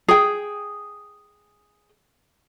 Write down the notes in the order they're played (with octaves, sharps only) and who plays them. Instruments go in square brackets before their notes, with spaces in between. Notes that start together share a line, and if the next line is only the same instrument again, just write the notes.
[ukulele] G#4 G5